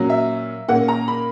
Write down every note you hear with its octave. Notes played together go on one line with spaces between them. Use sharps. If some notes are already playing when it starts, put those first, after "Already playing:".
Already playing: A#2 F#3 C#4
E5
A#2 A#3 C#4 F#5
A#5
B5